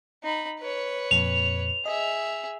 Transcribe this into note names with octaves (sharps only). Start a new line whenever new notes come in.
D#4 B5
B4 C#5
F2 A#2 F7
G#4 D#5 E5